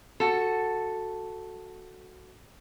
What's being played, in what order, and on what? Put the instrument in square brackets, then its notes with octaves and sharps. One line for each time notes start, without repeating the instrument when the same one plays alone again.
[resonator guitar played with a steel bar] F#4 A4